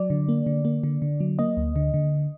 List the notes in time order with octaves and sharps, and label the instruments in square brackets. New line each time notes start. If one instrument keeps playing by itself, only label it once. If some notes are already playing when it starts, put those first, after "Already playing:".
Already playing: [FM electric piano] F#3 D5
D3
A#3
D3
A#3
D3
D3
F#3
A#3 D#5
D2
D3
D3